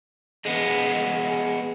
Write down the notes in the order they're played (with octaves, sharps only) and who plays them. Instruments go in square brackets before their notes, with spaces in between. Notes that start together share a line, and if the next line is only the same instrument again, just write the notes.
[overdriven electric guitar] G#3 B3